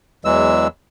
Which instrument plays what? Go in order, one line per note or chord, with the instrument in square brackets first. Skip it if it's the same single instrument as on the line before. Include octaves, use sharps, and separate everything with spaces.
[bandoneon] E2 E3 F#3 G#3 E6